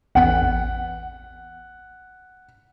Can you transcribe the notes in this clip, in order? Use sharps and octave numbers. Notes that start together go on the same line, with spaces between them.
A1 E2 B3 F#5